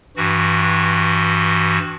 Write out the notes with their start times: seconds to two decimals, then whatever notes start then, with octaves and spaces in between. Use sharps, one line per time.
0.16 G2 E3 F#4